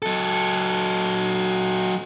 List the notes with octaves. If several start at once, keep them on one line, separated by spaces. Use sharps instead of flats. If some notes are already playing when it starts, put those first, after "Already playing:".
F#3 A4